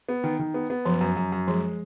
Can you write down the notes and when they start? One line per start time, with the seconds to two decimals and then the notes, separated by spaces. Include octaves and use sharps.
0.09 B3
0.24 D#3
0.39 D#3
0.54 B3
0.70 B3
0.85 F#2 F3
1.01 F#2
1.17 F#2
1.32 F#2
1.47 F3 G#3